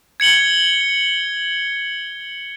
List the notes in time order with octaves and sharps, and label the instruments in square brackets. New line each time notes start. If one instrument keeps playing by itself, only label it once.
[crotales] G#6 C#7 F#7 G7